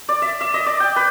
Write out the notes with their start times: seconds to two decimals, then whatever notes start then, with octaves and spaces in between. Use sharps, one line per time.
0.09 D5
0.22 E5
0.41 E5
0.54 D#5
0.66 D5
0.80 G5
0.96 B4